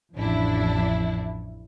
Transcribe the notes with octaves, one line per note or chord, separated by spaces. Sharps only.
A1 F2 D4 E4